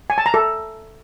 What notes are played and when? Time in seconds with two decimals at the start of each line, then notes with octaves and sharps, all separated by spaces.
0.10 G#5
0.18 A5
0.26 A#5
0.34 A4